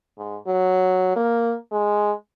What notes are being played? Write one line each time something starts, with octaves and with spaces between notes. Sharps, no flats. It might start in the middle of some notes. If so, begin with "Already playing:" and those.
G#2
F#3
A#3
G#3